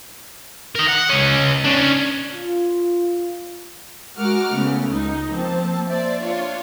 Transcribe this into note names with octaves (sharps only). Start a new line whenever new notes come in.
A#4 D#5
F#5
C#2 C#4
C#4 D4
F4
G#3 F#4 A#4 F#5 D6 F6
C#3 A3 B3
C#2 D#4
F3 A#3 C4 A5
C5 D5 E5
D4 F4 C#5